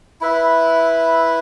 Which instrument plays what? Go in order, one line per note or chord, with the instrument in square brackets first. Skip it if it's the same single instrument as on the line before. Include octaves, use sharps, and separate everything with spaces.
[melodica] E4 B4 E5